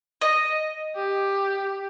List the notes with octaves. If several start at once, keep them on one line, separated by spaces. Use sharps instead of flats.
D#5
G4